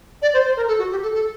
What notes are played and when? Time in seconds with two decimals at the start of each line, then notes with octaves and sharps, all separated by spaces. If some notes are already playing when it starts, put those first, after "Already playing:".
0.22 D5
0.34 C5
0.45 C5
0.57 A#4
0.68 A4
0.79 F#4
0.91 G4
1.02 A4
1.14 A4